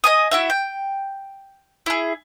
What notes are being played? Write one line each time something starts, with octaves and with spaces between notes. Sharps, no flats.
D#5 G#5 D#6
E4 F#4 E5
G5
E4 G#4